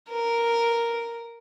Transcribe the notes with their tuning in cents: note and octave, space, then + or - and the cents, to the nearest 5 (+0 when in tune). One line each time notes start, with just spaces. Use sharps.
A#4 +0